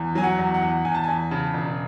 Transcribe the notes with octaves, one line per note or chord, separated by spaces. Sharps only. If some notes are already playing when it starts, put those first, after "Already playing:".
Already playing: E2
F#3 G#5
F#5
E2
F#5
E2
E2 G#5
A5
E2 G#5
C#3 A5
E1